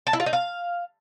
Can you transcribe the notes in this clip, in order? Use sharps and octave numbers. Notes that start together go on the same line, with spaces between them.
A5
E4
F4
D#4
F5